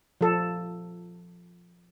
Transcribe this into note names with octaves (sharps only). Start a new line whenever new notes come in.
F3 A4